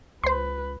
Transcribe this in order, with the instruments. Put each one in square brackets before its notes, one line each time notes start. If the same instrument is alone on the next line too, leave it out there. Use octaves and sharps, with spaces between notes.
[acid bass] C#2 [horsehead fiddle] B4 [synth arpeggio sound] C5 C6